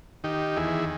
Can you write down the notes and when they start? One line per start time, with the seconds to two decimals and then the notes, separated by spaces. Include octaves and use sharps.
0.24 D#3 D#4 G4
0.56 E2 E4 G#4